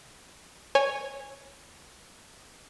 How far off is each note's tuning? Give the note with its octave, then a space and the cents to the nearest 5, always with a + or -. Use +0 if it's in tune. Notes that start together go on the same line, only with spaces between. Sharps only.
C#5 +0 G#5 -15